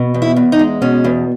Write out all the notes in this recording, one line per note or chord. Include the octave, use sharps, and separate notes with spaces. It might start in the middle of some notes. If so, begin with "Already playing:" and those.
Already playing: B2
E2
E4
E2
D#4
G#3
B2 C#4
E2